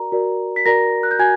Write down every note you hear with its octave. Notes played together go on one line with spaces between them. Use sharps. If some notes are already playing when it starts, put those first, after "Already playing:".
Already playing: F#4 A#4 D5 A#5
F#4 A#4 D5
B6
F#4 A#4 D5 A#5 A#6
F#6
G6
F#4 G#5 G#6